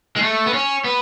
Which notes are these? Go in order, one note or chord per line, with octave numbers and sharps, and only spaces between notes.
G#3
A3
B3
C#4
B3